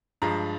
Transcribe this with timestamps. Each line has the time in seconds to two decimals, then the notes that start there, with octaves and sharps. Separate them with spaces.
0.22 G2 F3 G#3 A#5